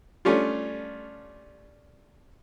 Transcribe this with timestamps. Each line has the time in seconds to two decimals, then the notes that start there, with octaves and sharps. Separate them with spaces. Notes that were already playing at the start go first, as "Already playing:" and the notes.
0.25 G3 A3 C#4 D4 F4